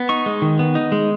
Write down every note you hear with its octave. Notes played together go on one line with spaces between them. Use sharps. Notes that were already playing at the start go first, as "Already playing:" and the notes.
Already playing: B3
D#4 C#6
G#3
D#3
B3
D#4
G#3